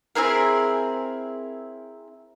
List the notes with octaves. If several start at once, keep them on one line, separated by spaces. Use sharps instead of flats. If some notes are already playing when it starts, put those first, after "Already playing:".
C4 E4 G#4 A#4